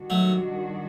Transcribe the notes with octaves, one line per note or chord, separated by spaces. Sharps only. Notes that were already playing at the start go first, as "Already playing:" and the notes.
Already playing: D#3 G3 D4 F#4
F#3 A3